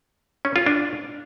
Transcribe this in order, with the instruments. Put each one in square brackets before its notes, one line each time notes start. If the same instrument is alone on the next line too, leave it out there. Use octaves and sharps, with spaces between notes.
[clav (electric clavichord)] C#4
F4
D4